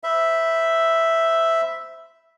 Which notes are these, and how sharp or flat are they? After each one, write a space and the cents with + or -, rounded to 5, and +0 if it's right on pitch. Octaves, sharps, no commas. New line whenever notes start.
C5 -15 E5 +0 B5 +0